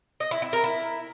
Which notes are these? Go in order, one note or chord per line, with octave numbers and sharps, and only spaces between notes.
D#5
E4
E4
A#4
E4